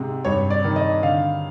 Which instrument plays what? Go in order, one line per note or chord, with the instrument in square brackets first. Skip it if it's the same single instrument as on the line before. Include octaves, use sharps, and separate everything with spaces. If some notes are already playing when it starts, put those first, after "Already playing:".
Already playing: [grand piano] G#2 C3 G#3
G2 C#5
D5
D#3
D#5
D3 F5